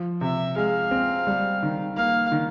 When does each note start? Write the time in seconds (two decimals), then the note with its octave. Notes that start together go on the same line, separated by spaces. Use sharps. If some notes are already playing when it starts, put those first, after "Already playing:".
Already playing: F3
0.21 C3 E5
0.56 G#3 F5
0.91 C4
1.27 G3
1.63 D#3
1.97 A#3 F5
2.32 D#3